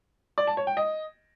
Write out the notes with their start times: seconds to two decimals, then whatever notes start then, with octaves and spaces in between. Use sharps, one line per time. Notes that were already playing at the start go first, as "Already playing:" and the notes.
0.38 D5
0.47 A5
0.57 C#5
0.67 G5
0.77 D#5